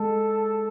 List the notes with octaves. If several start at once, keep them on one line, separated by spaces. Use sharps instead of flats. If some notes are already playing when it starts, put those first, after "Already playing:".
Already playing: G#3 A4